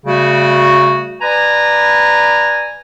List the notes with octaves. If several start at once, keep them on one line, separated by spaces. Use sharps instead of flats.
C#3 G3 A3 F#4
B4 D5 G#5 A#5